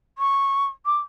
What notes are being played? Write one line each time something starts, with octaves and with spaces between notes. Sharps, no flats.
C#6
D6